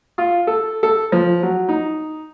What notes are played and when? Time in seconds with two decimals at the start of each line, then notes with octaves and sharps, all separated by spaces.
0.18 F4
0.47 A4
0.83 A4
1.12 F3
1.43 F#3
1.69 D#4